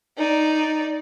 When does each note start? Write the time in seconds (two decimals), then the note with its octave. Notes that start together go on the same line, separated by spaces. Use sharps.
0.17 D#4 D5